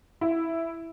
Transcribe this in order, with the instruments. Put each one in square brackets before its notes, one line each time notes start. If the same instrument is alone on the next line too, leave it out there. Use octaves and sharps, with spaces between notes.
[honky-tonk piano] E4